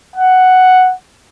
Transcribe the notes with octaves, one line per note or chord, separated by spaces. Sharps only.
F#5